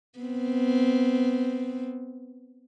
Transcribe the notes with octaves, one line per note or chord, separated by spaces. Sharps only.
B3 C4